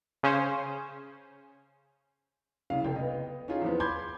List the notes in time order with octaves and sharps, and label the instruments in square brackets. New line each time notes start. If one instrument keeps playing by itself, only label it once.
[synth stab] C#3 C#4 C5
[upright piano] C2 C#3 F5
F1 G5
B3 D#5
C#4 D#4 F4 G#4
E2 F3 B3
B5 C6 D6 G6 G#6